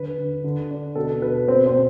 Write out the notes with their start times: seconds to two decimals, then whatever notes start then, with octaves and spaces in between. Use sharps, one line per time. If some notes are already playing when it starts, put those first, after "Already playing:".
Already playing: D3 B4
0.18 D3
0.44 D3
0.71 D4
0.95 B2 A4
1.22 B2 B4
1.48 B2 C4 C5
1.65 C4 C5
1.74 B2